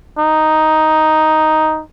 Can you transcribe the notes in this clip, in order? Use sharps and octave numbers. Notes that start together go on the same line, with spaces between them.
D#4